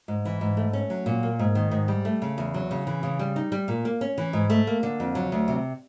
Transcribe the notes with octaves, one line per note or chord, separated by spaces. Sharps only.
G#2
E3
G#2
A3
C#4
F#3
A#2
A#3
G#2
D#3
G#2
G3
A3
C#3
E2
F#3
C#3
E3
C#3
G3
D#4
G3
A#2
A#3
C#4
E3
G#2
A3
A#3
D3
F2
F#3
D2
C3